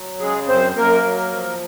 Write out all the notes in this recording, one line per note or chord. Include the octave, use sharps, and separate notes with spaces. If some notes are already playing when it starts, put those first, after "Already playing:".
Already playing: F#3
C#3 G#3 G#4
F#2 C4 C5
F#2 A#3 A#4
F#3
F3